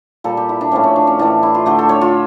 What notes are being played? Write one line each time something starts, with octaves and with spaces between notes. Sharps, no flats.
A#2 G3 A4
G4
E4
D4
A2 F3 A3 C#4
C#4
D4
C#4
A2 E3 A3 D4
E4
F4
D3 A3 G4
A4
C#5
F4